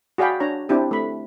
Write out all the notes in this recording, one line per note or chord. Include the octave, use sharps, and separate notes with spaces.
F#4 G#4 D5 F5 G5 B5
D4 C#5 A#5
C4 D4 E4 G4
A3 B5